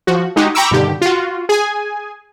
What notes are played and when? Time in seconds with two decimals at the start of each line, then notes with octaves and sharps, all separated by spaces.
0.07 F3 F#4
0.36 G#3 D#4 F#4 G4
0.55 G5 A#5 B5 C#6 D6 E6
0.71 G2 B2 D3 D#3 G4
1.01 F4 F#4
1.49 G#4 G#5